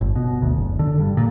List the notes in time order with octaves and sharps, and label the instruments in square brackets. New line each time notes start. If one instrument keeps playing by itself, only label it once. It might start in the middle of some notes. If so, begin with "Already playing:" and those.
[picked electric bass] G1
B2
D2
F#1
D3
G2
A#2